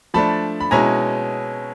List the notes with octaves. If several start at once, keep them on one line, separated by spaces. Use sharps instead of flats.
F3 A3 D4 A5 B5
B5
B2 G#3 C#4 E4 G#5 A#5